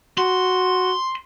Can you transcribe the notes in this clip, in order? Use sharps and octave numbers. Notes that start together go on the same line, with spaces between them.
F#4 C6